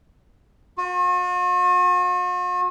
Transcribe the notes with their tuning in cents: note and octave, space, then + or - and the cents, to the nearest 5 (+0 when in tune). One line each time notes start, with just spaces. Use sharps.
F#4 -45